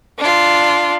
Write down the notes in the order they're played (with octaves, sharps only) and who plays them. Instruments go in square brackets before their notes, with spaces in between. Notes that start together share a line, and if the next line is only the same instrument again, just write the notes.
[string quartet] D4 F4